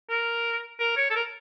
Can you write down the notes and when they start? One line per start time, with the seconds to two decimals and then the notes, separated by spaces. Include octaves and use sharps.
0.10 A#4
0.79 A#4
0.97 C#5
1.10 A4
1.15 A#4